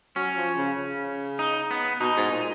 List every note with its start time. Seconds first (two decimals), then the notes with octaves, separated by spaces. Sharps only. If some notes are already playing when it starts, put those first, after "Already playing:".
0.16 F#3 C#4
0.36 F3
0.57 C#3
0.78 C#3
1.39 D#4
1.71 B3
2.00 B2 D#4
2.17 G#2
2.31 A#2